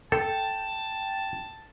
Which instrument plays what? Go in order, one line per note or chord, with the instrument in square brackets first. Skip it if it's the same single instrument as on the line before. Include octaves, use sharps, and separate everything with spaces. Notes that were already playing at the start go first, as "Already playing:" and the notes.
[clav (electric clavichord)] A4 [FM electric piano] G5 [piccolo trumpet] A5